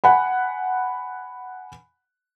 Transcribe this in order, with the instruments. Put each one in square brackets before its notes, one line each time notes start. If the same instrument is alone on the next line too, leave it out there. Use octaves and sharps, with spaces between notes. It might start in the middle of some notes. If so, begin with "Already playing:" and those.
[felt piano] F#5 G#5 B5